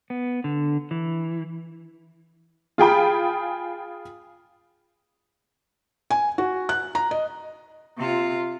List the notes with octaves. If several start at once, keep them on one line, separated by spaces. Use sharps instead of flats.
B3
D3
E3
F4 G#4 G5 B5
G#5
F#4
F#6
A#5
D#5
C3 F4